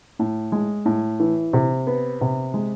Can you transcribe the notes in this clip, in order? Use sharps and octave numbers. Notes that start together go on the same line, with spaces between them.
A2
G#3
A2
E3
C3
B3
C3
G#3